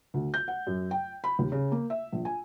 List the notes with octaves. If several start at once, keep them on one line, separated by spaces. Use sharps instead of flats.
D2
G6
F#5
F#2
G5
B5
D#2
C#3
A#3
E5
A#1
G#5